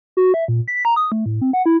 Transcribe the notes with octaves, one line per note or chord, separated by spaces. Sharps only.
F#4
E5
A#2
B6
A#5
D#6
A3
A2
C4
F#5
E4